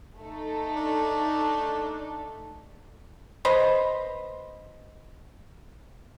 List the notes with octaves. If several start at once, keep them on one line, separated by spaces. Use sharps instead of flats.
A3 D#4 A4
D4
B4 C5 D#5